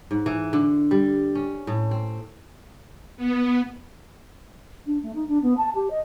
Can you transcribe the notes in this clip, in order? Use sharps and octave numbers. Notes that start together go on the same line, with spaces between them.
G#2
E3
D3
G3
C#4
A2
C4
B3
D4
A3
D#4
D4
B3
A5
G4
D#5